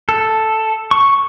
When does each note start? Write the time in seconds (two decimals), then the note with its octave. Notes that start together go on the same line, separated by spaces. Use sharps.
0.09 A4
0.91 C#6